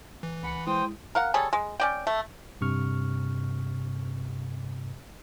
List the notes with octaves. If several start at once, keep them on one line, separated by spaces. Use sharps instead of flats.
E3
C#2 F#5 G#5 B5 C#7
G#3 E4 C5 G5 C6 D#6
A#4 F5 F#5
G3 G#4 A4 C#5
G#3
C#4 D5 G5
A3
G2 C3 C#6 F6